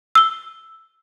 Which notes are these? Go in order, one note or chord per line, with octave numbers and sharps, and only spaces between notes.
E6 G7